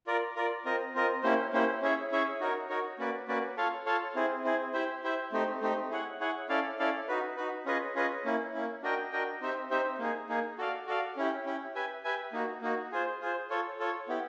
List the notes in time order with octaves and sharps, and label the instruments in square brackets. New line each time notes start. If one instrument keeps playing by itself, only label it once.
[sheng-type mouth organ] F4 A#4 D5
F4 A#4 D5
C4 F4 A#4 D#5
C4 F4 A#4 D#5
A#3 C#4 E4 G4 C5
A#3 C#4 E4 G4 C5
C#4 E4 G#4 C#5 E5
C#4 E4 G#4 C#5 E5
D#4 F#4 A#4 C#5
D#4 F#4 A#4 C#5
A#3 C#4 F#4 B4 D5
A#3 C#4 F#4 B4 D5
F4 A4 C#5 F5 A5
F4 A4 C#5 F5 A5
C4 E4 G#4
C4 E4 G#4
E4 G4 C5 E5
E4 G4 C5 E5
A3 C4 D#4 G4
A3 C4 D#4 G4
E4 G#4 C#5 F#5
E4 G#4 C#5 F#5
C#4 E4 A4 D5 F5
C#4 E4 A4 D5 F5
D#4 F#4 B4
D#4 F#4 B4
C#4 F4 G#4 B4 D#5
C#4 F4 G#4 B4 D#5
A#3 C#4 E4
A#3 C#4 E4
D4 F#4 A#4 D#5 G5
D4 F#4 A#4 D#5 G5
C4 D#4 G4 C5 E5
C4 D#4 G4 C5 E5
A#3 D#4 G#4
A#3 D#4 G#4
F#4 A4 D5 F5
F#4 A4 D5 F5
C#4 E4 G4
C#4 E4 G4
G4 B4 E5 G#5
G4 B4 E5 G#5
A#3 D#4 F#4
A#3 D#4 F#4
F4 G#4 C5
F4 G#4 C5
F4 A4 C#5
F4 A4 C#5
B3 E4 G4